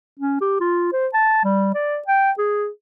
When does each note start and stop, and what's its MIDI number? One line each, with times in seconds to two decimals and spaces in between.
0.20 0.40 61
0.41 0.56 67
0.60 0.89 65
0.93 1.08 72
1.14 1.42 81
1.44 1.72 55
1.75 1.99 74
2.08 2.31 79
2.38 2.68 68